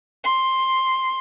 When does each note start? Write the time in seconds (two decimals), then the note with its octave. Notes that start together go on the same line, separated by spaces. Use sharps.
0.24 C6